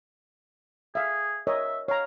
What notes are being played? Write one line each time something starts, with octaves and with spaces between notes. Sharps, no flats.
G#4 E5 F5
A#4 C#5 D#5 E5
C#5 F5 A#5